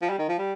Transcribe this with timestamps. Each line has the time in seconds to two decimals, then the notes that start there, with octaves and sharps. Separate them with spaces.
0.02 F3
0.09 G3
0.19 D#3
0.29 F3
0.38 G3